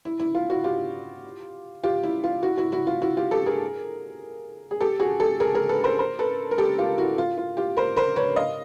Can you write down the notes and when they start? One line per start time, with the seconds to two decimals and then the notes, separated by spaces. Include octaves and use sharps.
0.05 E4
0.20 E4
0.35 F4
0.50 E4 F#4
0.64 F4 G4
1.83 F4 G4
2.03 E4
2.24 F4
2.43 E4 F#4
2.57 E4 F#4
2.72 E4 F#4
2.87 F4
3.02 E4 F#4
3.17 F4 G4
3.31 G4 A4
3.46 G#4 A#4
4.71 G#4
4.81 G4 A4
5.00 F#4 G#4
5.20 G4 A4
5.40 G#4 A#4
5.55 G#4 A#4
5.69 A4 B4
5.84 A#4 C5
5.99 A#4 C5
6.19 A4 B4
6.51 A#4
6.58 G4 A4
6.78 F4 G4
6.98 E4 F#4
7.18 F4
7.38 F4
7.57 F4 G4
7.77 A#4 C5
7.97 A#4 C5
8.16 B4 C#5
8.36 D#5 F5